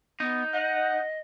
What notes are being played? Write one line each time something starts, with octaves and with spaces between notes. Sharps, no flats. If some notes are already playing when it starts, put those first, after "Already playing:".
B3 D#4
D#5 F#5